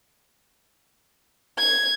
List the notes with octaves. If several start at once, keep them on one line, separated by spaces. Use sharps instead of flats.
G#6